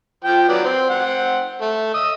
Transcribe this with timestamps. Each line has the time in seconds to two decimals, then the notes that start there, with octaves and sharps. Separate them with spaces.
0.24 F3 G5
0.49 F#3 B3 D5
0.64 C4
0.90 C4 F#5
1.61 A3
1.94 D#5 D#6 E6